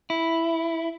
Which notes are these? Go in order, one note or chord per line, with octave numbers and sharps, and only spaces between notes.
E4